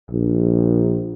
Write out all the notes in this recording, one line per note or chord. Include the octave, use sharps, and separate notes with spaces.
A#1